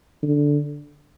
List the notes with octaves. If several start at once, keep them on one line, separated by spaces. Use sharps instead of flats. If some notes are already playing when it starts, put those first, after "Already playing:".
D3